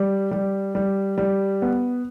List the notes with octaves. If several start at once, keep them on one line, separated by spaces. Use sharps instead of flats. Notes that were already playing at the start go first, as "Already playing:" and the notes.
Already playing: G3
G3
G3
G3
B3